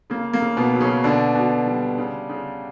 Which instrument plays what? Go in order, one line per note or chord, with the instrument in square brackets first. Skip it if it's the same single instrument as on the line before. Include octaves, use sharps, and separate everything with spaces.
[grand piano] C#3 A#3
A#3
C#3
B2 B3
F#3
C#3 C#4
B2 D3 D4
B2
G3
C#3
C#3